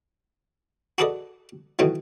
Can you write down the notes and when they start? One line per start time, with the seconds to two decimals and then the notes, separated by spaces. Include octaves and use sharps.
0.98 F#4 G#4 A4 B4 D5 D#5
1.79 B2 D#3 E3 F#3 A3